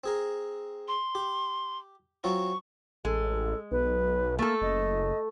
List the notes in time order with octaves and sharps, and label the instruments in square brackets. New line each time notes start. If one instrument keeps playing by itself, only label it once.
[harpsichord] C4 G#4 A#4
[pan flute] C6
[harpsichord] G4
[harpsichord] F#3 C4 F4 [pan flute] C#6
[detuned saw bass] A1 [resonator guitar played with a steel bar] G#3 [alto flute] A4
[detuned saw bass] B1 [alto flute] B4
[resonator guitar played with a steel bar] A3 A4 [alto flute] A#3
[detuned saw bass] F#1 [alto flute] D#5